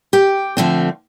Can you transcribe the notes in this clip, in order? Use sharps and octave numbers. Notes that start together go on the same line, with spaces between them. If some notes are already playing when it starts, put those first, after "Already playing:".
G4 G5
D3 F3 A3 C4